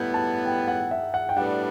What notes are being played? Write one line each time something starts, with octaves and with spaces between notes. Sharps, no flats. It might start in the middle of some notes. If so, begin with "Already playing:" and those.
Already playing: A2 G3 B3 E4 G6
A5
G5
F#5
E5
F#5
G5
A2 G3 B3 D4 F#5